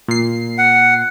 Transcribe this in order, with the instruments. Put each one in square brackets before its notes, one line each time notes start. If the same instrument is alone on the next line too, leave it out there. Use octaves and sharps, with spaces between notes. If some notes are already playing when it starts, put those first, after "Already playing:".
[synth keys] A#2 C7
[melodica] F#5